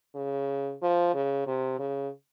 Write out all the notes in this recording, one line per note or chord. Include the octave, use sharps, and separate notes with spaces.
C#3
F3
C#3
C3
C#3